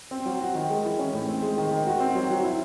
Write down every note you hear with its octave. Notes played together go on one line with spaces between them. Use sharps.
C4
F#3
F#4
D#3
G#3
E3
C#4
A2
C4
G#3
D#3
D#3
F#4
C4
F#3
F#3
E4